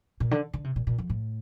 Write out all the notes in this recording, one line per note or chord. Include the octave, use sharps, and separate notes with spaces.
A#2
D3
D3
C3
A#2
A#2
F2
A2